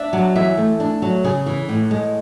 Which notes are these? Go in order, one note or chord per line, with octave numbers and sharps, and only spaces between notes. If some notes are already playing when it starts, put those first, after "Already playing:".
Already playing: D4 E5
F#3
E3 E5
A3
D4
F#3
C#3 G#4
E3
A2
G#3